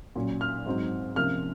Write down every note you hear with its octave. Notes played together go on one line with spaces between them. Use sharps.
A#2 F#3 C#4
F6
G#2 F#3 C4 D#4
C3 F3 A#3 C#4 F6